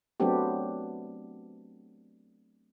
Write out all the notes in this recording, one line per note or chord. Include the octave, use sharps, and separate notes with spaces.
F#3 A3 B3 C4 D4 G4